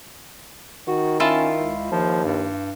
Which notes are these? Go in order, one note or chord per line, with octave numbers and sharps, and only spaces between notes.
D#3 F#4
C#4 E4 F4 A5
C#2
D#2 F3
G2